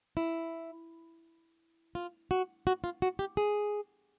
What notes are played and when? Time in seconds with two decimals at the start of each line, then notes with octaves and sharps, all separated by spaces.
0.17 E4
1.95 F4
2.31 F#4
2.67 F#4
2.84 F4
3.02 F#4
3.19 G4
3.37 G#4